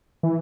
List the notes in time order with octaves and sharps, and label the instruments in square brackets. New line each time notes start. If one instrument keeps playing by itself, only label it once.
[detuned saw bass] E3